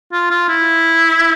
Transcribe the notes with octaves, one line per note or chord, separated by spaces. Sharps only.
F4
F4
E4